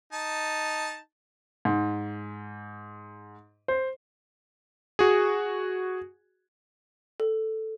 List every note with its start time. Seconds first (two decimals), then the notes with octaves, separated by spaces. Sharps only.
0.13 D#4 A5
1.65 G#2
3.68 C5
4.99 F#4 G#4
7.20 A4